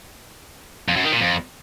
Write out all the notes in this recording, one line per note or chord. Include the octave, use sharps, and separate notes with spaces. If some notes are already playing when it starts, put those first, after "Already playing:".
F2
F#2
D#3
A#2
F2